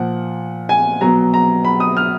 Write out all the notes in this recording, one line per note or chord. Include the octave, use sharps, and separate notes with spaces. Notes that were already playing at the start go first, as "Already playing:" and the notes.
Already playing: A#2 F3 F#5
G#5
B2 F#3 A#5
A#5
B5
D#6
F6